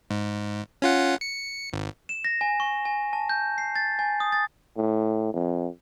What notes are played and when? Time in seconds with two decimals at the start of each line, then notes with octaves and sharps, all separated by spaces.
0.10 G#2
0.82 C#4 F4 F#5
1.21 C#7
1.73 G#1
2.09 E7
2.24 A#6
2.41 G#5
2.60 C#6
2.85 G#5
3.13 A5
3.29 G6
3.58 C7
3.76 A6
3.99 G#5
4.20 D#6
4.32 A6
4.76 A2
5.33 F2